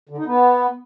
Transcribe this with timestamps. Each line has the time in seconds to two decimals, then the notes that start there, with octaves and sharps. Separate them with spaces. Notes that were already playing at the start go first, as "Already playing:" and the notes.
0.09 D3
0.18 D#4
0.26 B3